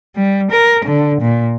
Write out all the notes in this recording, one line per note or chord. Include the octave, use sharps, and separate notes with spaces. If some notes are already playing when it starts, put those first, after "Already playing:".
G3
A#4
D3
A#2